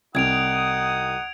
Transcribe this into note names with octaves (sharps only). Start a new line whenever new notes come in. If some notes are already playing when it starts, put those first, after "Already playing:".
C2 D#4 F#5 D#6 G#6 D7 F7